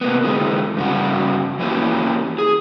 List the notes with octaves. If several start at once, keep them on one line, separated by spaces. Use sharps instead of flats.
C3 A#3 B3
D3 E3 G#3
G2 C#3 F#4
E3 A#3 C#4 E4 F#4 G4
G#4